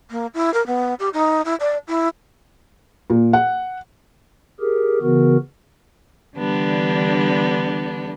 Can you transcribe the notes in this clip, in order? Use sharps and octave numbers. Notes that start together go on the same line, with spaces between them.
A#3
E4
A#4
B3
G4
D#4
E4
D5
E4
A#2
F#5
G4 G#4 A#4
C#3 E3 B3 F#4 A#4
D3 E3 G3 B3 D4